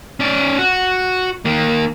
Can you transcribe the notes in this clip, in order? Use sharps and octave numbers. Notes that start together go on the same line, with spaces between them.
C#4 D5
F#4
D#3 A#3